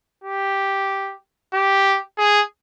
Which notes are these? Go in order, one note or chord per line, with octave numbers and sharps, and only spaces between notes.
G4
G4
G#4